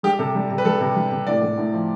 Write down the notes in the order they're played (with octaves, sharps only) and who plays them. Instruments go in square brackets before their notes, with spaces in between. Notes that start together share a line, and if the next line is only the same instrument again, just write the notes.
[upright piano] G3 G4
C3 A4
G3
C3
B4
G3 A4
C3
G3
C3
A2 D5
A2
A2
F3